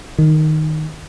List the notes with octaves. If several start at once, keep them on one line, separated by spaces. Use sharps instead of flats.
D#3